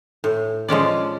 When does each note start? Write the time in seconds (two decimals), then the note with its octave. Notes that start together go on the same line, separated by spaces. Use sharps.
0.24 A2
0.68 F3 G#3 C#4 D5